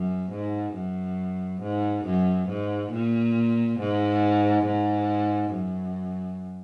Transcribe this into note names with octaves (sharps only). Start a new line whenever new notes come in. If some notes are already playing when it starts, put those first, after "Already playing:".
Already playing: F#2
G#2
F#2
G#2
F#2
G#2
A#2
G#2
G#2
F#2